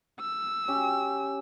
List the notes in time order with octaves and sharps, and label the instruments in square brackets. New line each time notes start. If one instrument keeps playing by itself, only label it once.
[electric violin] E6
[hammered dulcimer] C#4 G4